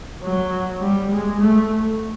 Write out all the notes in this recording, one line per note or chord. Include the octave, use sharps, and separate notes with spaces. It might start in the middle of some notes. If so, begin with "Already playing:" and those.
F#3
G3
G#3
A3